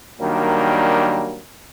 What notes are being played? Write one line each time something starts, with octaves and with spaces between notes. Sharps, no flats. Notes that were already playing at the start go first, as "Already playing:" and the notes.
D#3 F#3 G3 A#3 D4